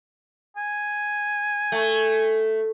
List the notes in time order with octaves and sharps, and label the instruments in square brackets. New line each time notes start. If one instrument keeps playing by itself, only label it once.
[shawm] G#5
[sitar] A3